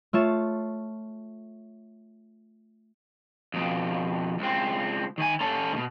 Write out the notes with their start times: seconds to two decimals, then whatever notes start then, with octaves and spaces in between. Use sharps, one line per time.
0.13 A3 F4 C#5 E7
3.54 F2 B2
4.39 C#2 C4
5.18 D#3 G#5
5.41 C#4 A4
5.73 G#2 B2